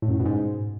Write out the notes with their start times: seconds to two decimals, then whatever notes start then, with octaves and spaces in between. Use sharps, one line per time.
0.02 A2
0.08 F#2
0.14 A2
0.20 B2
0.25 G#2